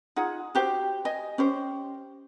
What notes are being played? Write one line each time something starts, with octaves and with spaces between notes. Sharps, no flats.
D#4 F4 G#4 F#5
F#4 G4 C5
D#5 G#5
C#4 G4 C5